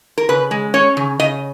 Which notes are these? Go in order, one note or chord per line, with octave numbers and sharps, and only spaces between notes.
A#4
C#3 B4
G#3
C#4 C#5
C#3
C#3 D#5